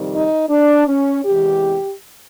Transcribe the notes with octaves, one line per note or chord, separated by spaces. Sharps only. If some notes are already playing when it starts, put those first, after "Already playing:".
Already playing: F2 C3 D#3 G3
D#4
D4
C#4
E2 C3 E3 G#3 G4